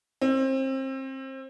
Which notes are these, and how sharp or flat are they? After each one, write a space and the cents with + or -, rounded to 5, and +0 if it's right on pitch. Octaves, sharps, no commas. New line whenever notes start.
C4 +30